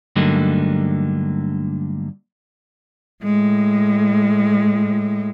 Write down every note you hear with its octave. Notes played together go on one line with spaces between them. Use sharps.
G2 D3 F#3 A3 A#3 D#4
A2 G#3